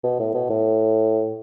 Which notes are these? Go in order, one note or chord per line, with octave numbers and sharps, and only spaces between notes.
B2
A2
B2
A2